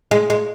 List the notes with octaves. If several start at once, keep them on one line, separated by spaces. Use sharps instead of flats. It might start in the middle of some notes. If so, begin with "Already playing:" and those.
G#3
G#3